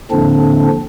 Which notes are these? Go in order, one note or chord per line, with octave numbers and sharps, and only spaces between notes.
D#2 A2 D3 F3 C4 D4